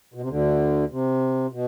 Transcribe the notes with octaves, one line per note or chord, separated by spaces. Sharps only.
B2
C3
D2 D3
C3
B2